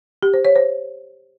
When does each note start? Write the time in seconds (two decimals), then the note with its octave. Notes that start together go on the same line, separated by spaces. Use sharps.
0.23 G4
0.34 C5
0.45 C#5
0.56 C5